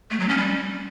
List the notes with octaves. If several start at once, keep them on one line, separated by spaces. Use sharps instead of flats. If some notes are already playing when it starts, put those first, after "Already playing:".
A3
F#3
C#4
G3